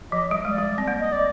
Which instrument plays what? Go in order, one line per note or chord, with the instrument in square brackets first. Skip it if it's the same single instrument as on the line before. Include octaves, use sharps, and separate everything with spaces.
[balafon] F3 [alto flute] D#5
[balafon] G3
G#3
[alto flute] D5
[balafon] G3
C4
A#3
[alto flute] D#5
D5